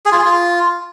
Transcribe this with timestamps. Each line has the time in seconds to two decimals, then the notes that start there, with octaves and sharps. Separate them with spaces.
0.06 G#4
0.12 F4
0.18 G#4
0.25 F4